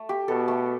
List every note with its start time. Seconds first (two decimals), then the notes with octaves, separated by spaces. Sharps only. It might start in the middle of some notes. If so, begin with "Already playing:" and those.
Already playing: A3
0.09 G4
0.28 B2 A4
0.48 A3